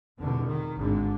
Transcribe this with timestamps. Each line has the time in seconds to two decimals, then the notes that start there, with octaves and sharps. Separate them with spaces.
0.19 F1 E2 B2 D3
0.48 D#3
0.77 G#1 G#2 D3